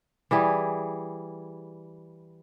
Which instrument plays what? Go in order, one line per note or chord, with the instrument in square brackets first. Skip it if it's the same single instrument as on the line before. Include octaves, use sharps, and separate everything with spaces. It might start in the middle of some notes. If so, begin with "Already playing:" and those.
[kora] E3 G3 G#4